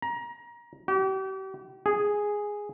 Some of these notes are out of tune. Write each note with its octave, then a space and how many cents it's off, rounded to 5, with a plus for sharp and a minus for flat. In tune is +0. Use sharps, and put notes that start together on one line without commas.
A#5 +25
G4 -40
G#4 -5